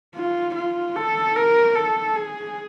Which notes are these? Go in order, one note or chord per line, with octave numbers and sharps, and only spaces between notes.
F4
F4
A4
A#4
A4
G#4